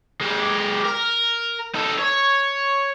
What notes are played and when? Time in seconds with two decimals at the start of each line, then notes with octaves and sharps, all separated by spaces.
0.21 G#3 G4
0.85 A#4
1.75 D#4 A4
1.99 C#5